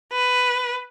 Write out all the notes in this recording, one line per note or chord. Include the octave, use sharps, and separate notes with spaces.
B4